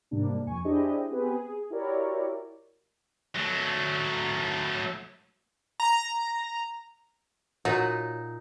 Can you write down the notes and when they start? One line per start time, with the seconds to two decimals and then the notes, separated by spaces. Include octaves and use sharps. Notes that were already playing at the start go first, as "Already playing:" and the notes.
0.11 G#2 C3 G3 A#3 D4
0.47 F2 G#5 C#6
0.65 D4 E4 G4 G#4 C5 D#5
1.10 B3 C4 G4 G#4 B4
1.30 G#4
1.70 E4 F#4 G4 A#4 C#5 D5
3.36 F#3 A3
5.80 A#5
7.65 A#2 F#3 D#4